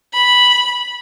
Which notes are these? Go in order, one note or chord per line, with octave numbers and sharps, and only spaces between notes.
B5